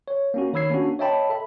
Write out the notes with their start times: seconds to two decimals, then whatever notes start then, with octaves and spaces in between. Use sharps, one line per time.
0.08 C#5
0.34 A#3 C#4 F#4
0.53 D#3 C#5 B5 E6 G#6 C7
0.70 A#3 C#4 D4 F#4
0.99 C#5 D#5 E5 G5 A5 B5
1.30 A4 E5 B5